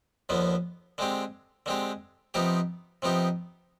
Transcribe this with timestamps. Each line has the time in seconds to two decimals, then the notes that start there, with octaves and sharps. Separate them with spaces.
0.29 D#2 D3 F3 B3
0.98 D3 G#3 C4 G4
1.66 D3 G#3 C4 G4
2.34 C3 F3 B3 D#4 G4
3.02 C3 F3 B3 D#4 G4